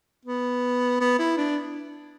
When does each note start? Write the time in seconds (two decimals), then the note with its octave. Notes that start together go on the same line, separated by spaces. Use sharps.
0.25 B3
1.00 B3
1.19 E4
1.37 D4